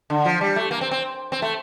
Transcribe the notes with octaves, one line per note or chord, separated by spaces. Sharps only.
D3
F3
G3
A3
A#3
C4
C4
C4
A3